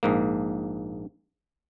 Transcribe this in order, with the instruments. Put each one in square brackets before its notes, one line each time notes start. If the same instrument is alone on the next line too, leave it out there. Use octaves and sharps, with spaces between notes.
[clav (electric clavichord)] A#1 G#2 A#3